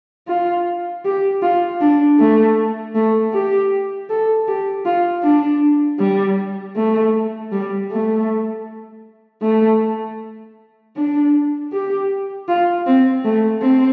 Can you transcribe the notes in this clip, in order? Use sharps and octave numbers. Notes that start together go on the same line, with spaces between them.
F4
G4
F4
D4
A3
A3
G4
A4
G4
F4
D4
G3
A3
G3
A3
A3
D4
G4
F4
C4
A3
C4